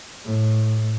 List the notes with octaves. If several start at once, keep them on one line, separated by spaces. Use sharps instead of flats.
A2